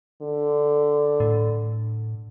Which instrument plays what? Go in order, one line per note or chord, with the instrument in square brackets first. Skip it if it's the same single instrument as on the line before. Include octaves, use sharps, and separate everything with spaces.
[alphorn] D3
[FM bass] A2